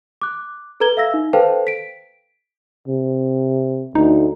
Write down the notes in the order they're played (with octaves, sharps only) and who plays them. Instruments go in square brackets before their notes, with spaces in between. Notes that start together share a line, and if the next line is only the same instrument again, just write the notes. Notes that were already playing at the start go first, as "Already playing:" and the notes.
[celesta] D6 F#6
A4 B4 A#5 G#6 G7
E5 F5 E6 A#6
D#4
A4 B4 C5 F5 G5 A5
B6 D7
[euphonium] C3
[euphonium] D2 [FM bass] D#4